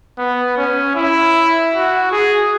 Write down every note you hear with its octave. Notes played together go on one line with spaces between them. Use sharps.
B3
C#4
E4
F#4
G#4